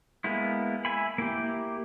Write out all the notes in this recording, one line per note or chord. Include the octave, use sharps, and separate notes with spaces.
G#3 A#3 B3 E4
E5 G#5 B5
A#3 E4 G4